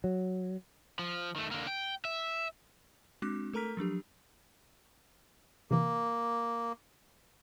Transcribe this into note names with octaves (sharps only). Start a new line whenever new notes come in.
F#3
F3
D#3 A3
D3 A#3
G5
E5
G#3 C4 D4 F#4 D6 F#6
A3 A4 A#4 A#5 F6 B6
F3 F#3 D4 G4
C3 E3 A#3